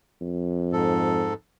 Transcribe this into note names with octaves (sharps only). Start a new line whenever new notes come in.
F2
G#2 A4